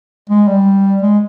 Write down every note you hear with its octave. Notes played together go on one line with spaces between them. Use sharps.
G#3
G3
G#3